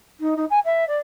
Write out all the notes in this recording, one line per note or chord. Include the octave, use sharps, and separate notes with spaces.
D#4
D#4
G#5
E5
D5